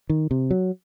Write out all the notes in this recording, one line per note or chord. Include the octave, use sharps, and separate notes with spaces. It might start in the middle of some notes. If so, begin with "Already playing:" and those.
D#3
C3
F#3